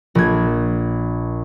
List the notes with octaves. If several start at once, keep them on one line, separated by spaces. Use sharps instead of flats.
A#1 G#6